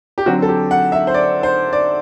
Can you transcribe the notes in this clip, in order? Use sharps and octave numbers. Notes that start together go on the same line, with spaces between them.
G4
D3 F#3 C4 F#4
A4
G4
F#5
E5
C5
D5
C5
D5